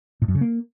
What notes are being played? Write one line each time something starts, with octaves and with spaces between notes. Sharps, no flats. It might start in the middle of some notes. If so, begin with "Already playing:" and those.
A2
F#2
C#3
A#3